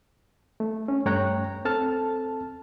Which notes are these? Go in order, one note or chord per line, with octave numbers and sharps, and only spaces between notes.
A3
C#4
G2 A3 C#5 G5 A#5 F#6
C4 A4 A5 F6